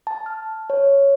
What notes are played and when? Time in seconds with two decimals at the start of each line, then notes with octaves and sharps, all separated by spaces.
0.07 A5
0.26 F6
0.70 C#5